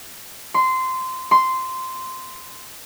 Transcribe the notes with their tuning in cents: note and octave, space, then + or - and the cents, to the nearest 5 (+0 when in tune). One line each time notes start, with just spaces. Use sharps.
C6 -15
C6 -10